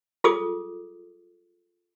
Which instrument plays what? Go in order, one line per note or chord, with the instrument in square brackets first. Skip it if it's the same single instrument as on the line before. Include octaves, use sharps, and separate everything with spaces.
[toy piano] F4 G#4 A4 D6 D#6